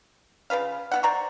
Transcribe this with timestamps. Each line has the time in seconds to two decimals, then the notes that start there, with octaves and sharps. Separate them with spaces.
0.50 C#3 F4 B4 F5
0.92 B3 F#4 F#5
1.03 C5 D5 A#5 C#6